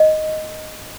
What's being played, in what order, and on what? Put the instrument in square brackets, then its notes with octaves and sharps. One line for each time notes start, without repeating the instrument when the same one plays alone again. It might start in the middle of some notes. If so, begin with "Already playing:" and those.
Already playing: [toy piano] D#5